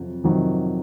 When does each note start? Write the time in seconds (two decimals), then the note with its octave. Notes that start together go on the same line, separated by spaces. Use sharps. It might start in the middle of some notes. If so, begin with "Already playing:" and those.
Already playing: F2 C3 F#3
0.23 F2 C3 D#3 F#3